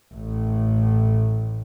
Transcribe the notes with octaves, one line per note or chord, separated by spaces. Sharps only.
A1 A2